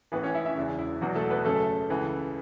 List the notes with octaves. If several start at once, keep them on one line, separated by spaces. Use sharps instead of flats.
A1 A2 E3 B3 B4
C#4 C#5
E4 E5
E4 E5
E1 E2 C#3 E4
E4
E1 E2 B2 F#3 F#4
A3 A4
B3 B4
F#1 F#2 C#3 A3 A4
C#2 C#3 E3